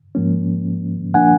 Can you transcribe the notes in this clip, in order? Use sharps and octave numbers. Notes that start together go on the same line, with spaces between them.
G#2 F3 A#3 C#4
A#2 F3 A#3 D4 F#5 G#5